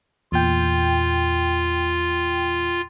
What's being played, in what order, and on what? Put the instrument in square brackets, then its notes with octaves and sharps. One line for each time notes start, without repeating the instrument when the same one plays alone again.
[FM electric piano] E2 A#2 G5 [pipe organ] F4